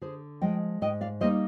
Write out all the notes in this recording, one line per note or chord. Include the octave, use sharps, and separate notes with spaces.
D3 G#4 C5
F3 G#3 D#5 G5
G#2 D#5 G5
D5 F5
G3 A#3 D#4 C5 D#5